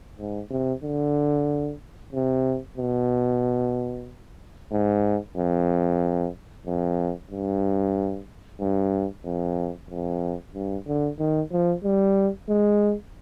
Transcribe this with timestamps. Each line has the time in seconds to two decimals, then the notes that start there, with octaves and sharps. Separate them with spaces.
0.18 G#2
0.50 C3
0.83 D3
2.13 C3
2.77 B2
4.72 G#2
5.37 F2
6.66 F2
7.31 G2
8.60 G2
9.25 F2
9.90 F2
10.54 G2
10.87 D3
11.19 D#3
11.52 F3
11.84 G3
12.49 G#3